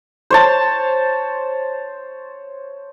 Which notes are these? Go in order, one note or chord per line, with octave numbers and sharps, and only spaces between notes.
C5 C#5 A5